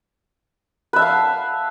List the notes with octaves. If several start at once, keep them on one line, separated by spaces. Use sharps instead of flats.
B4 E5 F5 A5